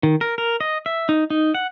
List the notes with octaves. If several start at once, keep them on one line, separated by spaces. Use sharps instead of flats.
D#3
A#4
A#4
D#5
E5
D#4
D#4
F#5